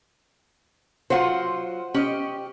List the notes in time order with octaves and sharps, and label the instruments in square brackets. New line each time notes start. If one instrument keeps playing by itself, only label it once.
[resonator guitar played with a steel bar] F#3 F4 [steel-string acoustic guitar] C5 F#5
[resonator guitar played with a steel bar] C#4 D#5 [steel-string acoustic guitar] G4